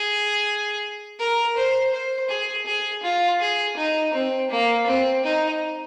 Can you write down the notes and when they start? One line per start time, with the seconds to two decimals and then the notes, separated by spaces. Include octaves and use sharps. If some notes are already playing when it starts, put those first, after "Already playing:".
Already playing: G#4
1.19 A#4
1.56 C5
1.93 C5
2.29 G#4
2.66 G#4
3.03 F4
3.40 G#4
3.77 D#4
4.13 C4
4.51 A#3
4.86 C4
5.24 D#4